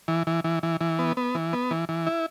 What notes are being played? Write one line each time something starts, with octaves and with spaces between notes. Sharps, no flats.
E3
E3
E3
E3
E3
B3
B3
E3
B3
E3
E3
E4